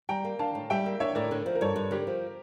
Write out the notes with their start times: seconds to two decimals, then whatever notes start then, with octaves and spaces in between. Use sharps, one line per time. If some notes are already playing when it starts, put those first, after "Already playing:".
0.09 G3 G5 A#5
0.25 A#3
0.39 D4 F5 A5
0.55 A2
0.70 G3 E5 G5
0.86 A#3
1.00 D4 C#5 E5
1.15 A2 A#4 D5
1.31 D3
1.46 F3
1.55 A#4
1.60 G2 A4 C#5
1.76 G2
1.91 D3 G4 A#4
2.07 F3